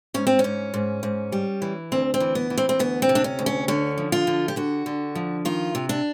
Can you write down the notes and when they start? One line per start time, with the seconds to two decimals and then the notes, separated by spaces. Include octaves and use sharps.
0.14 G#2 C#4
0.27 C4
0.39 C#4
0.44 G#2
0.74 G#2
1.03 G#2
1.32 G3
1.62 E3
1.92 D2 C4
2.14 C4
2.20 E3
2.35 B3
2.50 E3
2.58 C4
2.69 C4
2.79 D2 B3
3.02 C4
3.09 C3
3.15 D4
3.24 C#4
3.39 D2
3.46 C#4
3.68 D3 C#4
3.98 F3
4.12 F4
4.27 D3
4.48 G4
4.56 D3 F#4
4.86 D3
5.15 F3
5.45 D#3 F4
5.75 C3
5.89 D4